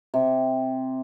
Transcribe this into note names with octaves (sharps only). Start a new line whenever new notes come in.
C3